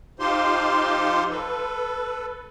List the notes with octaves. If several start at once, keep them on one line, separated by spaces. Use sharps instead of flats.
F3 D#4 F4 G4 C5 C6
A4 B4